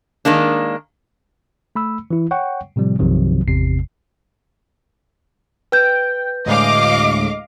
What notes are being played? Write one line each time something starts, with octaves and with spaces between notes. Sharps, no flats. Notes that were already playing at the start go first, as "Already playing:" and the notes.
D#3 G#3 A#3 D4
A3 B5 E6
E3 E4
C#5 F#5 G5 C#6
A2 C3 F3 G3
B1 F#2 C3 D#3 F3 F#3
G#1 E2 C3 C7
B4 G5 G6
D2 A2 G#3 D#5 F5 D6